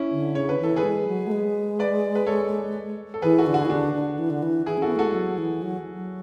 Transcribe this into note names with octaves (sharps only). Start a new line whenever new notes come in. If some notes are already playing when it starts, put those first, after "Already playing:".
Already playing: C#4 E4
D3
C#3 C#5
D3 B4
E3 A4
G#4 B4
G#3
F#3
A3
G#3
B4 D5
B4
A4 C#5
A4
E3 G#4 B4
F#4 A4
D3
F#4
G#4
E3
D3 D4 F#4
D3
E3
D3
E3
E3 E4 G#4
C#4
B3 F#4 A4
A3 F#4 A4
G#3
F#3
E3
F#3
F#3